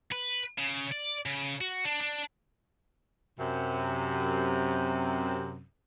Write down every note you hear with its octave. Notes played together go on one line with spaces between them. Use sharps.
B4
C#3
D5
C#3
F#4
D4
D4
F#2 C3